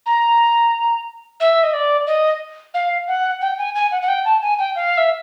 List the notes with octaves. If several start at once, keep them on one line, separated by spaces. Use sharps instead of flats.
A#5
E5
D#5
D5
D#5
F5
F#5
G5
G#5
G#5
F#5
F#5
G5
A5
G#5
G5
F5
E5